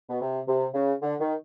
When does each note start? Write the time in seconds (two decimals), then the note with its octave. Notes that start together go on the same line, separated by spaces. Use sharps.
0.08 B2
0.21 C3
0.47 C3
0.74 C#3
1.02 D3
1.20 D#3